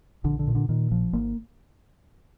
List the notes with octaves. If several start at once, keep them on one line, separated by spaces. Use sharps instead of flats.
A#1 D3
D3
A#2
D3
A#2 D#3
A#1 F3
G#1 A#3